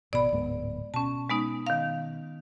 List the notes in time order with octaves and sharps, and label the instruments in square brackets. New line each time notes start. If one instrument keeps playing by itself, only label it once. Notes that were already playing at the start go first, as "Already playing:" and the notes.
[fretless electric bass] G#1 B2 [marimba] D5 B5
[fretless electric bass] D1 G#2 B3
[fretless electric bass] B2 [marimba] C#4 A5
[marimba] G#3 B3 D#4
D#3 F5